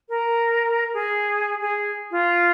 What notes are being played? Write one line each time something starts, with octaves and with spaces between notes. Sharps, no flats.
A#4
G#4
G#4
F4